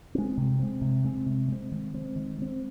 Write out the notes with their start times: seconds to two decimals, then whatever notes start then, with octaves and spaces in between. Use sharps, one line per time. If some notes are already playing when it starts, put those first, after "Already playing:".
0.15 G#3 C4
0.37 C3
0.59 G#3 C4
0.82 C3
1.04 G#3 C4
1.26 C3
1.48 G#3 C4
1.72 D#3
1.94 G#3 C4
2.16 D#3
2.38 G#3 C4